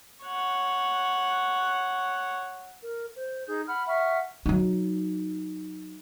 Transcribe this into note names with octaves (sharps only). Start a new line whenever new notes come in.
C#5 F#5
A#4
C5
D#4 G#4 G6
F#5 B5 F6
E5 F#5 C#6 F6
F#3 D#4